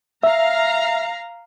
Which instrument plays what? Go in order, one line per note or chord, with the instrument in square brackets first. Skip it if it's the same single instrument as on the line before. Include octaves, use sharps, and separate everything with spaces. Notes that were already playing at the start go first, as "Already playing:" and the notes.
[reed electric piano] E5 [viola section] F5 A#5